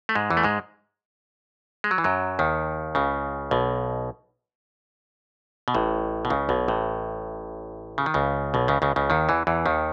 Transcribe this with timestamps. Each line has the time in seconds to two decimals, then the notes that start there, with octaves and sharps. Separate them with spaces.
0.09 A3
0.15 G#2 G#3
0.30 E2 E3
0.37 A3
0.43 G#2 G#3
1.84 G#3
1.91 F#3
1.98 E3
2.04 F#2 F#3
2.39 D#2 D#3
2.95 C#2 C#3
3.51 B1 B2
5.68 B2
5.75 A1 A2
6.25 B2
6.30 C#2 C#3
6.49 B1 B2
6.68 A1 A2
7.98 C#3
8.06 D#3
8.14 C#2 C#3
8.54 B1 B2
8.68 C#2 C#3
8.82 C#2 C#3
8.96 C#2 C#3
9.10 D#2 D#3
9.29 E2 E3
9.47 E2 E3
9.66 D#2 D#3